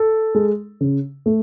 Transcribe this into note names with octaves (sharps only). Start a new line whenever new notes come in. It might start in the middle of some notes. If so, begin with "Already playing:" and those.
Already playing: A4
G#3
C#3
A3